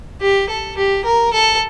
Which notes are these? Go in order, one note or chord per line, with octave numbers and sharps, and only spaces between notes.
G4
A4
G4
A#4
A4